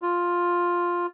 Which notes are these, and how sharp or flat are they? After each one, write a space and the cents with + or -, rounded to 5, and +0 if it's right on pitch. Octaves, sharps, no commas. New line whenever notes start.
F4 +5